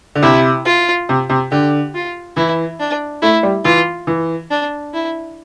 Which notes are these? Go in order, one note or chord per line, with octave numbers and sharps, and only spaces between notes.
D3
C3 E4
F4
C3
C3
D3 G4
F4
E3 E4
D4
A3 E4
G3
E3 F4
E3
D4
E4